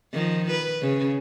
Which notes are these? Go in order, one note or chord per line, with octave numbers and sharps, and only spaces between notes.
D#3 F3
B4
C#3